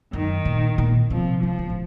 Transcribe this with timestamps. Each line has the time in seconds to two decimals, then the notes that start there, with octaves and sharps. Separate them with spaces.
0.13 F#2 D#3
0.45 A#2
0.78 A#2
1.10 C3 F3
1.43 C#3 F3
1.59 C#3
1.70 A2